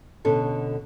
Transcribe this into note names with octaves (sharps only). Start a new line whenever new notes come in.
B2 D3 C#4 A4